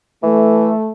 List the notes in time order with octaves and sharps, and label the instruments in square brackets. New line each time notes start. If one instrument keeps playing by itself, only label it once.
[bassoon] E3 [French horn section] A3